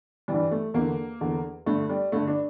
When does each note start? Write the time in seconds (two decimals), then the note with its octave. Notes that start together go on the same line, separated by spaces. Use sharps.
0.28 G2 E3 G3
0.51 A3
0.74 E2 D3 A#3
1.21 E2 D3
1.66 G2 D3 A3
1.89 G3
2.12 G2 D3 A3
2.28 D4